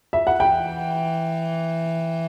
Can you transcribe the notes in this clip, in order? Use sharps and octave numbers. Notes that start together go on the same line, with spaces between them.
E5
F#5
E3 G5